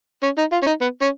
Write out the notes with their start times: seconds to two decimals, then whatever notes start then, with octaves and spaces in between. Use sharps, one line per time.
0.23 C#4
0.38 D#4
0.52 F4
0.63 C#4
0.66 D#4
0.81 B3
1.02 C#4